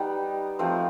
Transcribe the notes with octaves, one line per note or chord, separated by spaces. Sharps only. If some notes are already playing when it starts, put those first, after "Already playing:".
Already playing: G3 B3 D#4
F3 A3 C4 C5